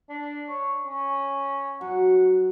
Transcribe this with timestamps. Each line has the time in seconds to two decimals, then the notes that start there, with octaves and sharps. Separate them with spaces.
0.09 D4
0.49 C#5
0.86 C#4
1.81 F#3 F#5